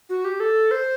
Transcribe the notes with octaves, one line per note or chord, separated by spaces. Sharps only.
F#4
G4
A4
C5